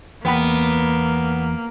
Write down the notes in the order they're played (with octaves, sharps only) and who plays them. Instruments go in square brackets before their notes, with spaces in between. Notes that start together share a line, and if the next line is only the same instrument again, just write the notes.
[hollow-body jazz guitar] E2 G5 B5 [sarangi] A#3 [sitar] B3